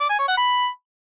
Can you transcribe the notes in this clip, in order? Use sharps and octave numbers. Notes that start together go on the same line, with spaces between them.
D5
G#5
C#5
F#5
B5